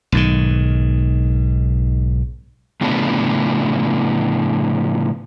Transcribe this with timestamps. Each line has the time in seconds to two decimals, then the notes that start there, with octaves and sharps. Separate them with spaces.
0.12 B1 G#2 D#3
2.81 A2 C#3 F3 A3 B3 D4